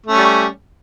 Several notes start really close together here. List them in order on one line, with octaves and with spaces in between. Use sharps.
A3 C#4 G3